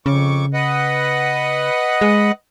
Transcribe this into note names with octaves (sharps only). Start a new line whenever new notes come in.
F2 C#3 C#6 D6
B4 D#5 F#5
G#3